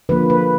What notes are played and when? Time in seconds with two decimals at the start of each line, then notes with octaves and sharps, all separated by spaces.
0.09 D3 F3 A#3 B4
0.30 B4